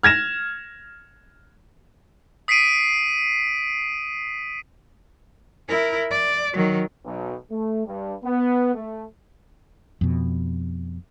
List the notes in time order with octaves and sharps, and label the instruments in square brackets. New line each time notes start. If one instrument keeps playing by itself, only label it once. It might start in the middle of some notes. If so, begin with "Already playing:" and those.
[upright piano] F6 G#6 A#6 E7
[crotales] D#6 B6 C7 D7 D#7
[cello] E4 A#4
D5
D#3 F#3
[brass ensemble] B1
A3
G2
B3
A3
[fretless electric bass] F2 B2